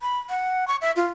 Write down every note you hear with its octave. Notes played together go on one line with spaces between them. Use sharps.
B5
F#5
C#6
E5
F4